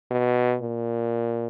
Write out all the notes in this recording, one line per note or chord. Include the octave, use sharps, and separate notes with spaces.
B2
A#2